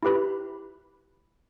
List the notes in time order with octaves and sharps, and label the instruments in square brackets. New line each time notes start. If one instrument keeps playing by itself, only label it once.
[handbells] E4 F4 G4 B4 B5